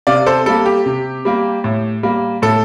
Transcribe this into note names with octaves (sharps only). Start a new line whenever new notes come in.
C3 D5 F5
A4 C5
G3 A#3 A4
G4
C3
G3 A#3
A2
G3 A#3
A2 A4